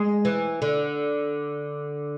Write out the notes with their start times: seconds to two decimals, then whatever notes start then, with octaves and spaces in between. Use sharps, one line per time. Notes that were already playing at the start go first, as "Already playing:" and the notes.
Already playing: G#3
0.25 E3
0.62 D3